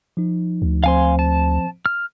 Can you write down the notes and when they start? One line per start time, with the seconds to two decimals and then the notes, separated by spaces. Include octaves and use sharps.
0.17 F3 D#4
0.62 D2
0.84 F3 C4 C5 F5 G#5 C6
1.19 A5
1.86 F6